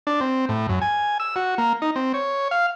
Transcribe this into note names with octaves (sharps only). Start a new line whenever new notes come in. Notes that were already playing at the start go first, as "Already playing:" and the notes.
D4
C4
A2
F#2
G#5
E6
F#4
A#3
D#4
C4
C#5
F5